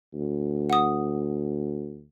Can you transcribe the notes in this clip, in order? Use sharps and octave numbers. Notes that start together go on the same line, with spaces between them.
D2
F#5 D#6